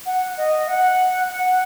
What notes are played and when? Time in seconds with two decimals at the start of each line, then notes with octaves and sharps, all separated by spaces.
0.06 F#5
0.37 D#5
0.68 F#5
1.30 F#5